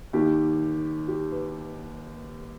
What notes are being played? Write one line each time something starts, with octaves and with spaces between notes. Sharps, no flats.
D#2 D#3 G4
G4
B4